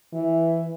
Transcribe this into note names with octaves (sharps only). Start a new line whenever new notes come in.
E3